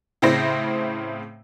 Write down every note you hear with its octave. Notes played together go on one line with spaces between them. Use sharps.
A2 C#3 C4 E4 C5 A#6